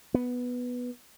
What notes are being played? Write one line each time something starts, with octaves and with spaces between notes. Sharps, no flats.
B3